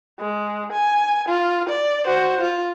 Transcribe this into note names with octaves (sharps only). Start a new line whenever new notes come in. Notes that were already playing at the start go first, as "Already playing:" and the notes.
G#3
G#5
F4
D5
F#4 C5
F4